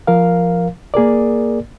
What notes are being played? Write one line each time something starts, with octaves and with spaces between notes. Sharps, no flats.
F3 A#4 F5
A#3 G#4 A#4 D5